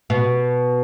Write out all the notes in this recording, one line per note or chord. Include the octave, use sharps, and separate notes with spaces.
B2